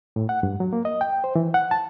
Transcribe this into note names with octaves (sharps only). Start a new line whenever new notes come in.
A2
F#5
G2
F#3
A#3
D#5
G5
C5
E3
F#5
A5